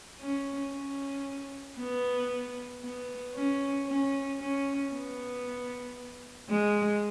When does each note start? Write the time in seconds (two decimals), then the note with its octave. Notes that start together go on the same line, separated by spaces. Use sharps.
0.21 C#4
0.73 C#4
1.78 B3
2.83 B3
3.35 C#4
3.87 C#4
4.40 C#4
4.92 B3
6.49 G#3